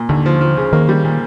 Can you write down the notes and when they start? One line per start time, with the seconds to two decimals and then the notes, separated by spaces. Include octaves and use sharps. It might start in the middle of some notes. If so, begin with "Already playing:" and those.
Already playing: A#2
0.09 D#2 D3
0.26 F3
0.41 F3
0.57 C#3
0.73 D#3 A#3
0.89 G3
1.04 A#2